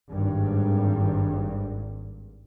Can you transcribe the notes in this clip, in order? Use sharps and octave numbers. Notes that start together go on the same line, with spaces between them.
G#1 G2